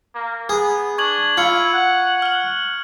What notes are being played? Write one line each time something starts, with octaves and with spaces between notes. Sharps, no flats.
A#3
B3 G#4
D4 C#6 G#6 F#7
E4 F4 G#6 C#7
F#5
F6 F#7